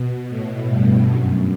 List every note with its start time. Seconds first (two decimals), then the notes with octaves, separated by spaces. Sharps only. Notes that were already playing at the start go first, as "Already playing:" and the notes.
Already playing: B2
0.29 A2
0.69 G2
1.11 F#2